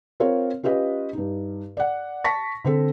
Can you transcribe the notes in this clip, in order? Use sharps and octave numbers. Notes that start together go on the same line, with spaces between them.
C4 F4 A#4 C#5
C#4 F4 G4 B4 D#5
G2 D#4
D5 F#5
A5 C#6 A#6 B6
D3 C4 A4